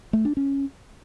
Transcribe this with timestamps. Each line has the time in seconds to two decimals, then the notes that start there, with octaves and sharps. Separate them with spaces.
0.13 A3
0.25 D4
0.37 C#4